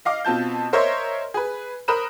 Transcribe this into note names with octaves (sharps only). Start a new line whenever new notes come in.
D#5 F5 D6
B2 C4 F4 A5 G6
A#4 C5 C#5 D#5 E5 C6
G#4 B4
A#4 C5 B5 D#6 F#6 E7